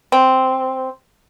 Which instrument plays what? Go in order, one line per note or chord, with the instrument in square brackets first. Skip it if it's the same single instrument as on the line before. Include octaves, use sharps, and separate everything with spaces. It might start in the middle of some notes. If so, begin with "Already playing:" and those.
[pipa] C4